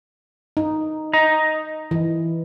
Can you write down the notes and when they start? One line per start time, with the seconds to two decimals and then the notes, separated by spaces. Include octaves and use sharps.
0.57 D#4
1.13 D#5 A#5
1.91 E3